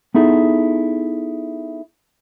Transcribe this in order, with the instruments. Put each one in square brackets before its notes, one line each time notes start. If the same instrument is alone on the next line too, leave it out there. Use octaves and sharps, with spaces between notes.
[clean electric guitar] B3 D#4 E4 G#4 A4